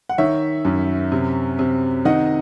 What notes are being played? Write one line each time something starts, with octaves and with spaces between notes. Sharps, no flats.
F#5
D#3 C#5 E5
F#2
C3
C3
D#3 D#5 F#5